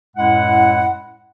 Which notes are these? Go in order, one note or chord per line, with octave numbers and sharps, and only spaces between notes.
F#2 A2 G#3 E4 F#5